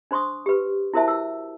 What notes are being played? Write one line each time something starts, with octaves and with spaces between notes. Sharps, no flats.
D4 C5 C6 C#6 D#6
G4 B4
E4 F#4 A#4 C5 E5 A5
E6